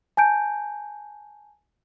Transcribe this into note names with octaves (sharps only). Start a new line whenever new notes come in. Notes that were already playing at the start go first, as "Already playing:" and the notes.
G#5 A5 G6 D7